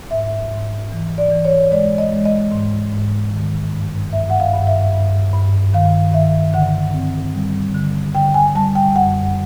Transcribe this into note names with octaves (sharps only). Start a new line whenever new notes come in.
G#2 E5
G#2
E3
D5
E3
C#5
G#3 D5
D#5
G#3
D#5
G#2
G#2
D#3
G2
G2 E5
F#5
F5
G2
E5
G2
G2
D#3 F5
D#3 E5
D3 F#5
C4
G3
D3
D3 G5
G#5
G3 A5
G5
F#2 F#5